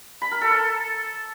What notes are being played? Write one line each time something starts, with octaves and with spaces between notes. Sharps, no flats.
B5
A#4
A4
A5